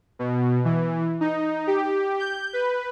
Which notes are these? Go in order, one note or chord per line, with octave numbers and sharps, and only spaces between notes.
B2
E3
D#4
G4
G6
B4